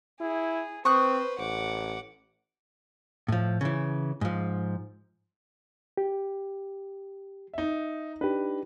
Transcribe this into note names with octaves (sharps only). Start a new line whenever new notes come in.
E4 G#4
C4 B4 C5 C#6 D#6 F#6
A1 F#5 D6
A2 F3
C#3 E3
G#2 F3
G4
D#4 E5
D4 D#4 G4 B4